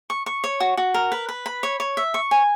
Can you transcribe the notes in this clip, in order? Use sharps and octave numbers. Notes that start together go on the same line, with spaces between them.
C#6
C#6
C#5
F#4
F#4
A#4
B4
B4
B5
C#5
C#5
E5
C#6
G#5